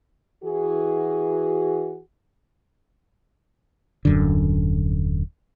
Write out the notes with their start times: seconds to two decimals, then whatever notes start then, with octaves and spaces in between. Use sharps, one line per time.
0.44 E3 F#4 G#4
4.05 D#1 F#2 D3